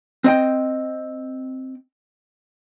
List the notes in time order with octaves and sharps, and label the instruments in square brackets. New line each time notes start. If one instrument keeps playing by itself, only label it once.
[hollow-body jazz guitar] C4 D#5 G5